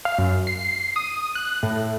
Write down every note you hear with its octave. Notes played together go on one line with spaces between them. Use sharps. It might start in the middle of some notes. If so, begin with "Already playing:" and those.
F5
F#2
C7
D#6
F#6
A2